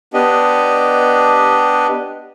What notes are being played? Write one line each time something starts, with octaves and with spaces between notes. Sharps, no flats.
B3 D4 G4 D#5